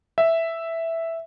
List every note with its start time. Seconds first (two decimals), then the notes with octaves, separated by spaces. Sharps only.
0.18 E5